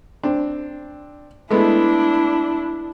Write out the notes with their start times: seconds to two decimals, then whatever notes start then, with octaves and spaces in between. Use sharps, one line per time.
0.23 C4 D4
1.51 G#3 A3 B3 D4 E4